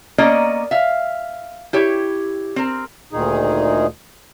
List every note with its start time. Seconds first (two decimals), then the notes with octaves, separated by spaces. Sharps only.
0.18 A#3 B3 C#4 A#4 D5 D#5
0.71 E5 F5
1.73 E4 G4 C#5
2.56 C4 A#4
3.12 D2 A#2 D#3 D#4 G#4